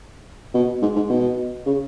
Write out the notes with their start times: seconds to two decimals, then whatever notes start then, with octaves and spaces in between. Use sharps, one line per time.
0.54 B2
0.82 G#2
0.96 G#2
1.10 B2
1.66 C#3